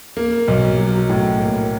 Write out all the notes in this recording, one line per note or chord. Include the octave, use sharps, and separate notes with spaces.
A#3
B1
F#3
A2
A#3